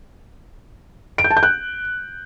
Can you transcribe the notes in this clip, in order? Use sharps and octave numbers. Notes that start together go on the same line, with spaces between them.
D7
G6
A5
G6
F#6